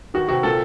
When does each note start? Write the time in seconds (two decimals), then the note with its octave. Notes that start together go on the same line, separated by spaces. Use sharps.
0.14 D#3 F#4
0.29 C3 F#4
0.43 A#2 A4